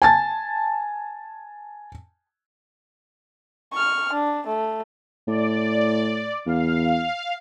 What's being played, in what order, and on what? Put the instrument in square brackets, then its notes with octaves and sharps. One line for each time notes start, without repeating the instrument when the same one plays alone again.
[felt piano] G#5 A5 A6
[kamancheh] C#6 F6
D4
A3
[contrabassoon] A2 [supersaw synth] D5
[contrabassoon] E2 [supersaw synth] F5